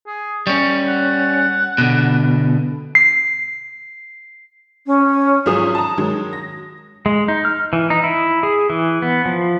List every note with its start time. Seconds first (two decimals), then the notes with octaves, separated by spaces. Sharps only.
0.07 G#4
0.47 G3 C#4 C#6
0.88 F#5
1.78 B2 D3
2.95 C7
4.86 C#4
5.46 G#1 F3 F#3 G#4 D#6 E7
5.75 A5 A#5
5.97 D#3 F#3 G#3
6.33 A#6
7.06 G#3
7.28 D#4
7.45 F6
7.73 E3
7.90 D#4
8.04 E4
8.43 G#4
8.70 E3
9.02 B3
9.26 F3